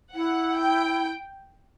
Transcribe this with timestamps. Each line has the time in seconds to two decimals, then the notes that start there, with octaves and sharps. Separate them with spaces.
0.14 E4 F#5
0.60 G5